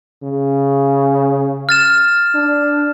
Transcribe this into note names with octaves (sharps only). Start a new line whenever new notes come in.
C#3
F6 A6 E7
D4